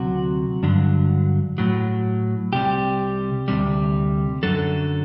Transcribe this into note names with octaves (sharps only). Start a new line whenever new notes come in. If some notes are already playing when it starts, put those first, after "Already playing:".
Already playing: D2 C3 F#3 F#4
G2 D3 F#3
A2 F#3
C2 C3 G3 G4
D2 C3 G3
F#2 D3 F#3 A4